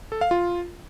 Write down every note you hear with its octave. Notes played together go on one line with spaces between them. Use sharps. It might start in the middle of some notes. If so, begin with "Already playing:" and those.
A4
F5
F4